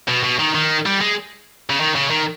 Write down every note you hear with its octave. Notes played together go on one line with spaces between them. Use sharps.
B2
B2
D#3
D#3
G3
G#3
C#3
D#3
C#3
D#3